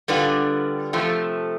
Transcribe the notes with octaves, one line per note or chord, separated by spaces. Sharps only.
D3 G3 B3 D4 F4
C3 F3 A3